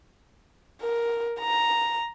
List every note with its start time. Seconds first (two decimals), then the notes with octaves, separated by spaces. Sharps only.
0.82 A#4
1.40 A#5